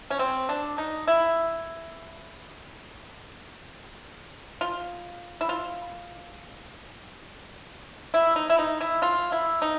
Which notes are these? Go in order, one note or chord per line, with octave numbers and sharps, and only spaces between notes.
C#4
C4
D4
D#4
E4
F4
E4
F4
E4
D#4
E4
D#4
E4
F4
E4
D#4